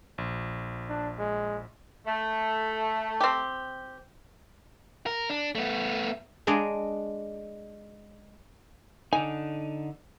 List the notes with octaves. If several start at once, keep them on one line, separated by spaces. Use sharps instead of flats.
A#1
D4
G#3
A3
C4 G4
A#4
D4
A3 B3
G#3 D4 D5 D#5 G#5 A#5
D3 D#4 G#5